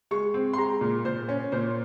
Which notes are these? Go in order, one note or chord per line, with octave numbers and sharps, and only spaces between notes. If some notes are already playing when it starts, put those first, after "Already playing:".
G#3 C#6
C4
C6
G#3 A#5
A#2
A#2 C5
C#4
A#2 C5